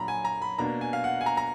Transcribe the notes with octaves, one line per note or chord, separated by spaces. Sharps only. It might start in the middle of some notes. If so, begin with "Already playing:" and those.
Already playing: A#2 F#3 D4 A#5 B5
G#5
A#5
B5
B2 A#3 D4 A#5
G#5
F5
F#5
G#5
A#5
A#5